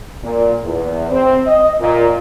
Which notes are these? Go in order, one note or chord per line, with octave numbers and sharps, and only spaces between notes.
A#2
E2
C4
D#5
A#2